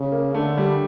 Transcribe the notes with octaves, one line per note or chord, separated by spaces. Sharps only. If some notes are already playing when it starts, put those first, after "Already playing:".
Already playing: C#3
A#3
D3 A3
G3